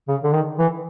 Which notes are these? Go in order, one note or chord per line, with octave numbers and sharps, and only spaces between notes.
C#3
D3
D#3
E3